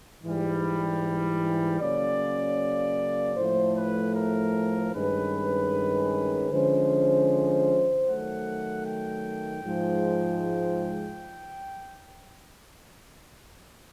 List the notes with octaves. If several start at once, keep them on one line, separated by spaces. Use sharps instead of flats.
G#2 E3 G3
C#3 F#3 A#3 C#4 D5
A2 F3 A3 C5
B4
A#4
G2 D#3 G#3 C#4 B4
D3 F3 G#3 C#4 C5
D#3 F#3 A3 F#5
G5
G#2 F3 G#3